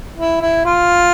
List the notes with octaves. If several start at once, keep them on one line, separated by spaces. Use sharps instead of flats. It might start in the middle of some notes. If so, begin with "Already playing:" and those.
E4
E4
F4